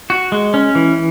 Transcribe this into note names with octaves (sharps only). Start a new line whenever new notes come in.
F#4
G#3
C#4
E3